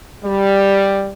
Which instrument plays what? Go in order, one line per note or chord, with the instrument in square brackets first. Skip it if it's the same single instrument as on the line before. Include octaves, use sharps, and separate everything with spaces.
[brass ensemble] G3